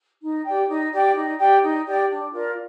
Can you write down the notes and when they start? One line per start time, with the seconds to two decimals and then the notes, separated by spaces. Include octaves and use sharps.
0.21 D#4
0.45 G4 D5 G5
0.68 D#4
0.92 G4 D5 G5
1.15 D#4
1.39 G4 D5 G5
1.62 D#4
1.86 G4 D5 G5
2.08 D4
2.33 F4 A#4 D5